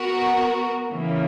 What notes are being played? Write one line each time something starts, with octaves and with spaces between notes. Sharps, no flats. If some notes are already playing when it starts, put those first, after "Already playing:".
Already playing: B3 F#4 A#4
C#3 E3 A#3